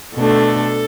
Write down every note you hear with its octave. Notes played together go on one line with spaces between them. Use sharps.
B2 A3 D4 A4